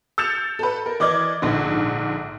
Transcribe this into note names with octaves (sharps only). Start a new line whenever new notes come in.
E6 G6 A6 C#7 E7 F7
A4 B4
A#4
E3 D5 D#5 D6 F6 G#6
A#1 G#2 D3